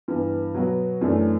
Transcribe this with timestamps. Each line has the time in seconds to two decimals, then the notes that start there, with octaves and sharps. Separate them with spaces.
0.08 G2 E3 B3
0.54 B2 F#3 B3 F#4 B4
1.01 F#2 E3 A3 D4